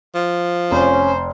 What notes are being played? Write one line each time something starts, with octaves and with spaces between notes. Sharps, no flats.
F3
F1 C#4 C5